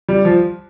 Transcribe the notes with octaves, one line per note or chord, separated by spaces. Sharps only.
G3
F3